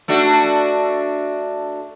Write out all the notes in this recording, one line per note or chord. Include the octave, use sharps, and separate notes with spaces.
A3 D4 F#4